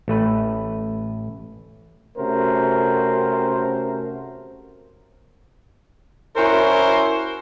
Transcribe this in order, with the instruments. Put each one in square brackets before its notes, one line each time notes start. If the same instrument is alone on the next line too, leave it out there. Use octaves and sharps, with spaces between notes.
[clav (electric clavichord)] A1 A3 B4
[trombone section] C3 A3 C#4 F#4 A#4 C5
[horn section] C#4 E4 F#4 A#4 C5